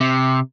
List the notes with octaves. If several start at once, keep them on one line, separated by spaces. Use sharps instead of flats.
C3